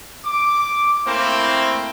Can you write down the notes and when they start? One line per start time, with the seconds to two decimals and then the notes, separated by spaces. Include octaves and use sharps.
0.25 D6
1.05 A3 A#3 C4 E4 C5